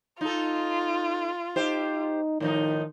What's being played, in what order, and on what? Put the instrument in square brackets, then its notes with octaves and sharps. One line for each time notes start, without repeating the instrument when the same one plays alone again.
[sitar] D#4 A4 [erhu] F4
[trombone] D#4 [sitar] G4 C5
[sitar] A2 F3 D#4 [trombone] D#3